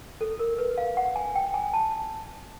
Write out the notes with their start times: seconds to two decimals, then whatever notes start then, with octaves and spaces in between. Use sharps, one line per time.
0.21 A4
0.39 A#4
0.59 B4
0.77 F5
0.97 F#5
1.16 G#5
1.35 G5
1.54 G#5
1.73 A5